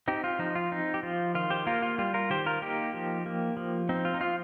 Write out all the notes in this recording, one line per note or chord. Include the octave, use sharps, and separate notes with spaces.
C4 D#4 G4
F4
F3 D#4
F4
C4 D#4
G4
F3 F4
D#3 F4
G4 C5
A#3 F4 A#4
F4
G3 F4
F4 A#4
D#3 G4 C5
F4 A#4
A#3 D#4 G4
F3
A#3
F3
C4 D#4
F4
D#4
F3 F4